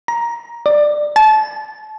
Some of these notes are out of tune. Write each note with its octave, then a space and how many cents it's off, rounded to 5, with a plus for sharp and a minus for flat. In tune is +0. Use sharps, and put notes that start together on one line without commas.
A#5 +10
D5 +15
A5 -30